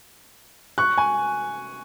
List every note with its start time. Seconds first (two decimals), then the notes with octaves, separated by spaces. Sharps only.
0.78 C#6 F#6
0.98 G#5